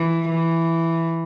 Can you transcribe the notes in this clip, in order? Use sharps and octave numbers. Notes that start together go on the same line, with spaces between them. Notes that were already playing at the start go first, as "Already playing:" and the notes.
Already playing: E3
E3